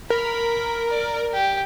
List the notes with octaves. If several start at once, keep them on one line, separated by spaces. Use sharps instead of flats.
A#4 B5
D5
G4